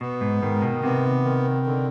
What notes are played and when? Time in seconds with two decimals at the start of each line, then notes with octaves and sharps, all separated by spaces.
0.01 B2 B3
0.21 G#2
0.42 G#2 D#3
0.62 B2
0.83 C3 B3
1.24 D#3
1.66 D3